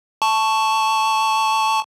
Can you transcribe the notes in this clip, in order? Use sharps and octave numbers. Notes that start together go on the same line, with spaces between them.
A5 C#6